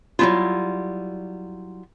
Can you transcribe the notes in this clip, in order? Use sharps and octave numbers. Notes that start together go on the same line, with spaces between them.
F#3 G3 C4 E4 F4